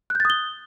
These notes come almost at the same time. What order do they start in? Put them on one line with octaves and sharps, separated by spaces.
F#6 G6 A6 D#6 G7